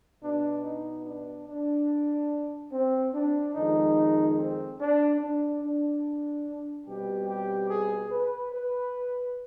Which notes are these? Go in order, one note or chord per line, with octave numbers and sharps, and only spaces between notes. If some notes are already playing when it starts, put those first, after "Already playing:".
B2 B3 D4
D#4
D4
D4
C4
D4
F2 D#3 G#3 D#4
C4
D4
D4
D4
B2 G3 C4 G4
G4
G#4
B4
B4